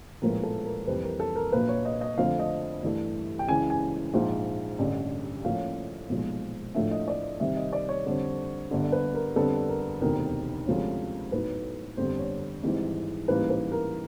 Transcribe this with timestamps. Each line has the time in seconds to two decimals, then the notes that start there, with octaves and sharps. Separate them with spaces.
0.22 A#1 A2 F3 G#3 B3 A#4
0.43 A4
0.65 A#4
0.87 F1 F2 C3 E3 G3 B4
1.03 A#4
1.20 A4
1.36 A#4
1.52 A#1 A#2 F#3 A#3 B4
1.69 C#5
1.85 D#5
2.01 D#5
2.18 F2 D3 F3 A3 C4 F5
2.39 D#5
2.83 G2 E3 A3
3.39 G5
3.48 C#2 C#3 E3 G#5
3.70 G#5
4.14 A#1 G#2 F3
4.79 A1 G2 D3
5.45 A2 F3 A#3 C#4 F5
6.09 B1 A#2 F3 G#3
6.75 A2 F3 A3 D4 E5
6.91 D#5
7.08 D5
7.40 C2 C3 D#3 G3 E5
7.57 D#5
7.73 D5
7.89 C#5
8.06 F2 D3 G3 C4
8.71 G1 G2 D3
8.92 B4
9.15 A#4
9.36 F2 D3 G3 B3 A4
9.69 A#4
10.01 E1 D2 C3 D#3 A#4
10.67 D2 C3 F3 G#3 C#4
11.32 A2 F#3 B3 D#4 B4
11.97 G1 F2 D3 G3 C5
12.19 C#5
12.63 G#1 G#2 E3 G3
13.28 A1 G#2 E3 G3 A#3 B4
13.50 B4
13.72 A#4